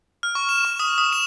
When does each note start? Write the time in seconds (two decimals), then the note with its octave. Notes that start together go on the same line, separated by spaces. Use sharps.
0.23 F6
0.35 C#6
0.49 E7
0.65 C#6
0.80 D#6
0.98 D#6
1.13 E7